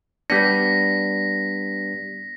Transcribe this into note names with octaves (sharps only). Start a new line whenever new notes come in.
G3 B3 D4 A#6 B6